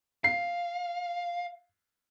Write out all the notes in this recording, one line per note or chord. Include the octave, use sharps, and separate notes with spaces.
F5 C7